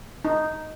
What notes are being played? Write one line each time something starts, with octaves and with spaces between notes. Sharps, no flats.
D#4